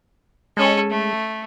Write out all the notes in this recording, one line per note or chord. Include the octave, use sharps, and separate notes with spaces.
G#3 C#4 A4
A3